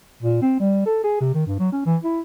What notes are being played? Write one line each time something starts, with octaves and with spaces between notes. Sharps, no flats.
A#2
C4
G3
A4
G#4
C3
D#3
G2
F#3
C#4
E3
E4